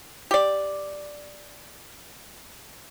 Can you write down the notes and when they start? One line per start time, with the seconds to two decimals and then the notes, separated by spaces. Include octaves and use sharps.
0.31 G4 D5